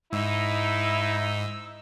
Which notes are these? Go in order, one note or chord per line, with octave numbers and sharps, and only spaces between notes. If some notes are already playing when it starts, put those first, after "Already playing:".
G#2 D#4 E4 E6